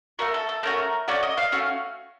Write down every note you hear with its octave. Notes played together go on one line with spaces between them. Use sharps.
A3 C#4 F#4 A#4
A4
A4
A3 C#4 F#4 A#4
A3 C#4 F#4 D5
D#5
F5
A3 C#4 F#4